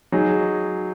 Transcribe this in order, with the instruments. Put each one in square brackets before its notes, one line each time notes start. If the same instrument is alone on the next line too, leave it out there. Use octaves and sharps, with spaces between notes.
[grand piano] F#3 D#4 G#4